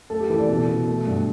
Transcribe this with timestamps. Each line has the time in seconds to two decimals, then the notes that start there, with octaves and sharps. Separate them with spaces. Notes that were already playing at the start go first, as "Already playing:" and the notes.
0.10 A3 A4
0.20 G4
0.30 E3 A4
0.39 D5
0.49 B2 A4
0.69 B2
0.87 A3
1.07 G2